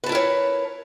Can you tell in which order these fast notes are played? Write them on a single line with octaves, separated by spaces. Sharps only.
B4 A5 E4 A#4 C#5